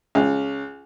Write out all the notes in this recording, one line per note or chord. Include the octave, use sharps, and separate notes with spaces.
C#2